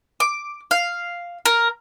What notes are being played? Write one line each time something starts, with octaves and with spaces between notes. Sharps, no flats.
D6
F5
A#4